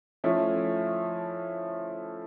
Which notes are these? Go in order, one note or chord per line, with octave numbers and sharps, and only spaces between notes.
F3 A3 C#4 E4